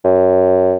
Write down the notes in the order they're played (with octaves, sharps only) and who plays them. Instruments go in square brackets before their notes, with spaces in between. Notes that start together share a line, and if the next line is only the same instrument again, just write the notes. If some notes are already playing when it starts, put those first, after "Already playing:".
[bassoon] F#2